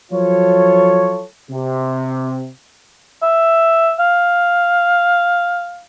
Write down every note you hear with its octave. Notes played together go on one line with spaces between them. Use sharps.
F3 F#3 F4 A4 C#5
C3
E5
F5